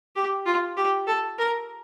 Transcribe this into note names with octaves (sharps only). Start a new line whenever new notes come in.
G4
F4
G4
A4
A#4